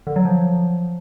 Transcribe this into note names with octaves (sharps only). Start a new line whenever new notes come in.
D3
F#3
F3